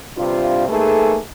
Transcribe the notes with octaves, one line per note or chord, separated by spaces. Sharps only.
G2 C3 F4
G#2 A3 A#3 G#4 A4 B4